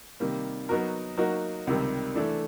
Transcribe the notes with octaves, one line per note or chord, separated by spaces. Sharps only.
C3 D#3 G3 A#3
F#3 B3 D#4 F#4 A#4
F#3 A#3 D#4 F#4 A#4
C#2 C3 D#3 G3
E3 A3 D4